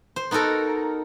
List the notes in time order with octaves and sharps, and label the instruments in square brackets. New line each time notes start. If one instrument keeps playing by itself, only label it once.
[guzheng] C5
B3 D#4 F#4 A4 A#4